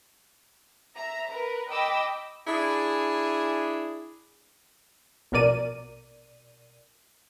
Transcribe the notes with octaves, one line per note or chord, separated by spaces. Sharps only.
E5 A#5
A#4 B4 A#5
D#5 G5 B5 D6 E6
D4 E4 G#4
A#1 B2 A#4 D5 D#7